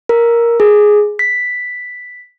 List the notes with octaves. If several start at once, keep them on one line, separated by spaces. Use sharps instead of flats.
A#4
G#4
B6